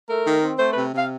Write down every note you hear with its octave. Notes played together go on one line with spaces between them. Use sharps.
A3 A#4
D#3
C4
A3 C5
C3 B4
C3 F5